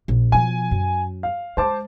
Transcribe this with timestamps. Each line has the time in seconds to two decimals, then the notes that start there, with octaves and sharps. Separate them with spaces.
0.08 A#1
0.32 B2 F3 G#5
0.71 F#2
1.23 F5
1.57 G#3 C5 A5 D6